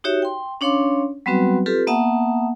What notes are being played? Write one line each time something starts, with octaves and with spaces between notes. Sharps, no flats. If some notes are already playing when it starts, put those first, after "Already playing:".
D#4 F#4 G4 C#5 E5
G5 C6
C#4 D4 C#5 F5 C6 D6
F#3 G3 B3 C4 F#4 B4
C4 F4 G4 A4 B4
A#3 B3 E5 F#5 A5 D#6